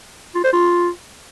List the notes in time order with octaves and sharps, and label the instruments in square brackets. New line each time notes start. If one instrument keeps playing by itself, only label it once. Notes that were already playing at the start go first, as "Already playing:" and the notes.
[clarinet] F4
C5
F4